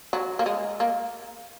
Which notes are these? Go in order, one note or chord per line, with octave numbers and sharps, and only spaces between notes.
F#3
A#3
G#3
A#3